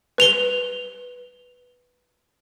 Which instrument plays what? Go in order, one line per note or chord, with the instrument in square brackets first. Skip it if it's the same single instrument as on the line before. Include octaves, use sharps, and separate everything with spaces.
[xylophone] B4 F7 G7